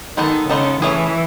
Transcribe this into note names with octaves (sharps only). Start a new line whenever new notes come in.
D#3 G#3 B3 D#4 A4
C#3 G#3 B3 D#4 A4
E3 A3 C#4 E4 G#4